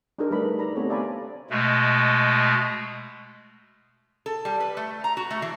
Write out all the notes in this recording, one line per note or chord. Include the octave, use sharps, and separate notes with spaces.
D4 D#4 G4 G#4 A#4 C5
G3 A3 D#4 B4 B5
G3
D5 A#5 B5
A3 B3 C4 G4 A4 C#5
C5 D5 F5 G#5 A#5 B5
B2 G#3 A3
A4
G3
B4
A3
A#5
F#4
A3
E3